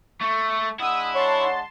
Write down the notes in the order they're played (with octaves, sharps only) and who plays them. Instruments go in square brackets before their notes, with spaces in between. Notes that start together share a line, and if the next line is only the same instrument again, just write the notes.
[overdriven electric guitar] A3 [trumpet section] C#6
[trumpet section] G#3 D4 F#5 [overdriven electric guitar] E4 [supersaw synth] D#6 E6
[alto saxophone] C#5 [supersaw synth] A5 C6